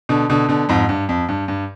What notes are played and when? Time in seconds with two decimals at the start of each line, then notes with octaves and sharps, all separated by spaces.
0.09 B2 D3
0.29 B2 D3
0.49 B2 D3
0.69 F2 G#2
0.89 G2
1.09 F2
1.29 G2
1.48 G2